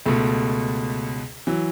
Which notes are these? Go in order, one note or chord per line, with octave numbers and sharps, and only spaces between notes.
C#2 B2 A3
E3 F#3